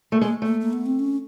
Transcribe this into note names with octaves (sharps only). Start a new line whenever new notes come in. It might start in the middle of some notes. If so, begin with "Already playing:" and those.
A3
G#3 A#3
A3 A#3
A#3
B3
C4
C#4